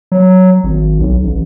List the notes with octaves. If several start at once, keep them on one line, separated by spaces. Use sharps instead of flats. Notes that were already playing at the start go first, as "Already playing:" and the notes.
F#3
G#1
B1
A1